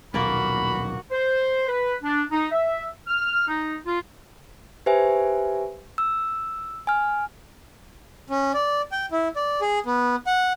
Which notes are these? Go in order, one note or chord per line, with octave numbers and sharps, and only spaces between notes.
D#1 B1 A#3 F#4 D5 B5
C5
B4
D4
D#4
E5
F6
D#4
F4
G4 B4 C5 E5 G#5
E6
G#5 F6
C#4
D5
G5
E4
D5
G#4
B3
F#5